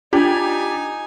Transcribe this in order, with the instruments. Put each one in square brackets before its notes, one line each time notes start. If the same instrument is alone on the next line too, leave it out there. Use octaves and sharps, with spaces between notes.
[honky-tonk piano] D4 G4 [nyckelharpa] D#4 G#5 [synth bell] F4